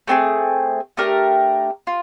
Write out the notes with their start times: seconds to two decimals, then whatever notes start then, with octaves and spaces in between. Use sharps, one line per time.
0.07 A3 C4 F4 G#4
0.97 A3 D4 G4 A#4
1.87 F4